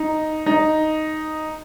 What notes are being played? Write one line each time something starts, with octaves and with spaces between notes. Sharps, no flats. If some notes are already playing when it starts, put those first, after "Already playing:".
Already playing: D#4
D#4